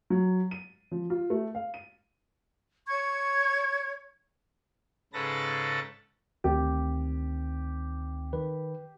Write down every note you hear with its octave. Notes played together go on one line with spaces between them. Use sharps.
F#3
D#7
F3
F4
A3
F5
D#7
C#5 C#6 G#6
G#2 C#3 A4 B4 A6 A#6
D2 D#3 C4 G4
D#3 B4